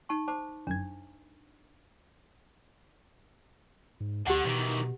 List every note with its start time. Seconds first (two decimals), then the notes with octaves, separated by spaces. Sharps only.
0.09 D#4 A5 C#6
0.28 C5 A5 D6
0.67 G1 F#2 D4 G#6
4.00 G#2
4.27 D2 D3 G4 F#5
4.45 B2 D#3 E3